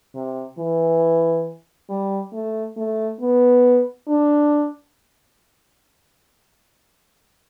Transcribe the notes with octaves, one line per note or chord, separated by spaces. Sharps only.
C3
E3
G3
A3
A3
B3
D4